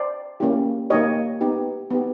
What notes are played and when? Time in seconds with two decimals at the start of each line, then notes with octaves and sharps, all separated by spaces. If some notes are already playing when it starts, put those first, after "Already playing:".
Already playing: C5 D5
0.40 A#3 C#4 E4 G4
0.90 A#3 D#4 G4 C#5 D#5
1.41 B3 D#4 G4
1.90 B3 D#4 G4